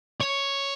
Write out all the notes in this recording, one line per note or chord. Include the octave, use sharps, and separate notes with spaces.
C#5